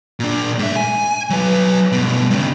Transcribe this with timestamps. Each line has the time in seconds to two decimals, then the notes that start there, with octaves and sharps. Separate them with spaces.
0.20 A#2 D4
0.59 G#2 E5
0.77 G#5
1.30 F#3 B4
1.92 G2 B2
2.30 G2 C#3